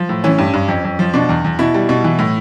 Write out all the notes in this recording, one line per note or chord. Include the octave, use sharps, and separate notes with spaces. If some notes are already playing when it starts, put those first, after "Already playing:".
Already playing: F3
A2
E3 C#4
G2
G2
F2
F2
F3
B2 D4
E2
E2
B2 E4
G3
B2
E3
A2